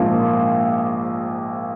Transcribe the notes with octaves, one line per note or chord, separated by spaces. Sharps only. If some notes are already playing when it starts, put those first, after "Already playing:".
Already playing: A#1 G#2 F3 A#3 F4